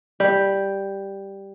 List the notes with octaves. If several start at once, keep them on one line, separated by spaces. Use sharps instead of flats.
G3